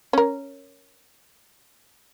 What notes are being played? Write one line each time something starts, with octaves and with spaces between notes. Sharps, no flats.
C#4 A#4